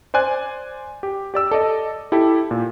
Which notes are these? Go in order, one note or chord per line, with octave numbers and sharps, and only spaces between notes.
C5 D5 G#5 F#6
G4
G4 D5 E6
A4 D5 D#5
E4 G4 A4
A#2